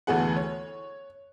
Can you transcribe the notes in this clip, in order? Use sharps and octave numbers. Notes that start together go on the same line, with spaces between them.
D2 E3 A3 B3 G#4 F#5
C#5